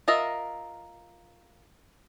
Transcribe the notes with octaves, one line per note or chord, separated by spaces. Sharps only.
F4 A#4 D#5 E5